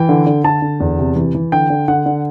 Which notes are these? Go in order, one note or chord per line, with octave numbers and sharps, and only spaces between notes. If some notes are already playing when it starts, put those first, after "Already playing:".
Already playing: E3 G5
D3
D3
D3 A5
D3
E2
C3
E3
E3
D3 G5
D3
D3 F#5
D3